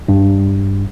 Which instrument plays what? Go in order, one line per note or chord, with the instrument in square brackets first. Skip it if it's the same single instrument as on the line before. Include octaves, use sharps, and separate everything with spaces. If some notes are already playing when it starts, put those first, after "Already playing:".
[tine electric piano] G2